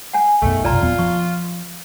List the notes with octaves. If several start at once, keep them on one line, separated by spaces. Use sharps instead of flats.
F#5 G#5
B1 F#2 D#3 G#3 A3 B3
F1 B1 F4 D5 A#5
D#1 F2 B3
F3 C#6